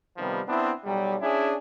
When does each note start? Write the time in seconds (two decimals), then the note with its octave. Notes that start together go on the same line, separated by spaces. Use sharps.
0.17 C3 D#3 F3 G3 B3
0.48 B3 C4 D4 E4
0.84 B1 F#3 G3
1.21 C#4 D4 E4 G#4